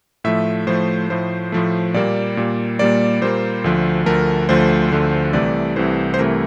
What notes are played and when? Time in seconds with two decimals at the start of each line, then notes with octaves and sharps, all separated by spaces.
0.24 A2 F3 A3 E5
0.67 A2 F3 A3 C5
1.10 A2 F3 A3 C5
1.52 A2 F3 A3
1.94 A#2 G3 A#3 D5
2.37 A#2 G3 A#3
2.79 A#2 G3 A#3 D5
3.21 A#2 G3 A#3 C5
3.64 D2 D3 F3 A3
4.06 D2 D3 F3 A3 A#4
4.49 D2 D3 F3 A3 C5
4.92 D2 D3 F3 A3
5.33 C2 C3 E3 A3 D5
5.76 C2 C3 E3 A3 C5
6.14 C5
6.18 C2 C3 E3 A3 A#4